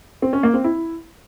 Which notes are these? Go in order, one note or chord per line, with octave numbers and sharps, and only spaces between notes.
C4
C#4
A#3
C4
E4